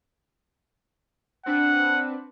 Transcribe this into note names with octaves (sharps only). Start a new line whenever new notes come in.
C4 D4 B4 F#5